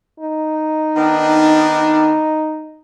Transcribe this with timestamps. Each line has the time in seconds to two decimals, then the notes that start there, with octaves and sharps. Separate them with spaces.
0.20 D#4
0.96 D#3 B3 D4